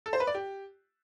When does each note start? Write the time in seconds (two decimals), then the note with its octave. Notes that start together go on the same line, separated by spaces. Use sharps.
0.06 A4
0.13 C5
0.20 B4
0.27 D5
0.34 G4